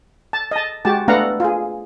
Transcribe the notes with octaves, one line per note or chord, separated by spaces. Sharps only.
A5
D#5 A5
G#3 F#4 G4 A5
A3 B3 D4 F5 F#5 A#5
F4 G#4